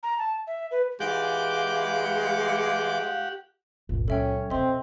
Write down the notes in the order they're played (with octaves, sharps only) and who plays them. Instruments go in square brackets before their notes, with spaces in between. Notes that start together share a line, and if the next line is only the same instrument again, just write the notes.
[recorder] A#5
A5
E5
B4
[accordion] E3 D6 G6 [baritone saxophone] G#3 [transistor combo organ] G4 F#5 [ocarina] F5
[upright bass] G1 [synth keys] C#2 A#2
[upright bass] F#3 [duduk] C#4 [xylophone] A4 E5 G5
[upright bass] F2 B2 [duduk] C4 [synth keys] D#5 [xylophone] E5 C6